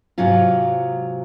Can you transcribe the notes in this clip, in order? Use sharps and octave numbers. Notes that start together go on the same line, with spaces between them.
G#2 C3 F#3 F4